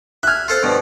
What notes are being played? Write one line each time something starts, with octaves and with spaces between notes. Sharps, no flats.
E5 G#5 F6 F#6
F4 A4 C5
G2 B2 F3